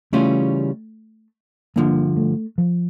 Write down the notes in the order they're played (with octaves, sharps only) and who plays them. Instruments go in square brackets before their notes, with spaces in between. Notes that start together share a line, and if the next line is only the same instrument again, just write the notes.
[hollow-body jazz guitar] C#3 E3 G3 C#4 F4 [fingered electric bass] A3
[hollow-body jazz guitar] G2 D3 F3 [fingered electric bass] A#3
[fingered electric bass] A3
F3